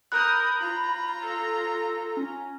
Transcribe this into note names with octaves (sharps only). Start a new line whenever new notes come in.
A#4 B5 D#6 F#6 G6
F4 A#5
A4
C#4